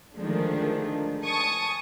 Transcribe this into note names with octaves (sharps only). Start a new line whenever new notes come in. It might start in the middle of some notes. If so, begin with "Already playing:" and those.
D3 D#3 F3 G#3 A3 D4
G#5 A5 C#6 D#6